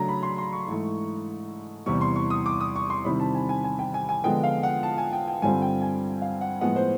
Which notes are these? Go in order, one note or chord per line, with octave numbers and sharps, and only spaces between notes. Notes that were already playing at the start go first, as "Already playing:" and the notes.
Already playing: C#3 F#3 A3 D4 A#5
B5
C6
C6
C#6
G#2 E3 A3
E2 C3 E3 G3 C#6
C6
C#6
D#6
D6
D#6
C#6
C6
C3 D#3 G3 C4 E4 B5
A5
G#5
G#5
G#5
G5
G#5
G#5
D3 F3 G#3 B3 G5
F5
F#5
A5
G#5
G5
G5
G2 D3 G3 C4 F4 G#5
G5
G#5
F5
F#5
A2 F3 G#3 B3 F#5
C5